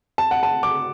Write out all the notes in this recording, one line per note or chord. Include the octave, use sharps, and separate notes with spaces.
A5
F#5
A5
D6